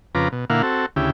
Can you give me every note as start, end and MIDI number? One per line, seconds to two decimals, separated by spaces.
0.15 0.28 41
0.15 0.28 49
0.15 0.28 65
0.15 0.28 71
0.15 0.28 82
0.15 0.28 86
0.32 0.45 47
0.50 0.62 46
0.50 0.62 50
0.50 0.62 58
0.50 0.62 64
0.50 0.62 77
0.50 0.62 78
0.63 0.86 60
0.63 0.86 66
0.63 0.86 69
0.96 1.10 38
0.96 1.10 49
0.96 1.10 64
0.96 1.10 67